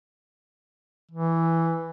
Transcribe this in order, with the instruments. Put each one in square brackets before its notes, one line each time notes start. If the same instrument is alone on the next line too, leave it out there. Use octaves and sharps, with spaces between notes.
[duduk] E3